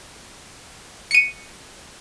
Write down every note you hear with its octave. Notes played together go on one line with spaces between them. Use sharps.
C#7 D#7